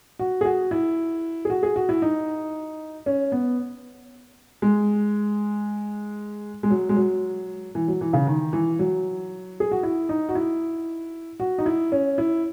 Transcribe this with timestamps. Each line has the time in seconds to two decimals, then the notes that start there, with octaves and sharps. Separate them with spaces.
0.19 F#4
0.41 G#4
0.45 F#4
0.71 E4
1.45 G#4
1.50 F#4
1.63 G#4
1.76 F#4
1.89 E4
2.02 D#4
3.06 C#4
3.32 B3
4.62 G#3
6.63 G#3
6.71 F#3
6.89 G#3
6.97 F#3
7.75 E3
7.88 F#3
8.01 E3
8.13 C#3
8.27 D#3
8.53 E3
8.79 F#3
9.60 G#4
9.71 F#4
9.83 E4
10.09 D#4
10.29 F#4
10.35 E4
11.40 F#4
11.58 D#4
11.66 E4
11.92 C#4
12.18 E4